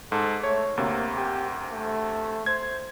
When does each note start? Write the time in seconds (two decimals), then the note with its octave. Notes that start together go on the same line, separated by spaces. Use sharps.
0.12 G#2 A4
0.44 A3 C#5
0.77 D2 C3 A#3
1.16 G4
1.72 A3
2.46 C5 G#6